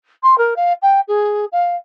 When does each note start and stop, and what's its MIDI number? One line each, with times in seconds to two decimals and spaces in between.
0.23 0.38 84
0.38 0.54 70
0.56 0.73 77
0.82 1.00 79
1.08 1.45 68
1.52 1.76 77